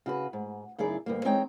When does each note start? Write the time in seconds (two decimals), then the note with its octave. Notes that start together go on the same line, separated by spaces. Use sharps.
0.06 C#3 F#4 B4
0.33 G#2
0.78 F#2 C#3 D#4 E4 G#4 D5
1.06 D2 G2 A#3
1.24 E2 G#3 C4 D#4 C#5 G5